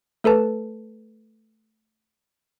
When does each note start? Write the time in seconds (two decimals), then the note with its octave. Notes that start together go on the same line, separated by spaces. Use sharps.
0.24 A3 A4 B4 A5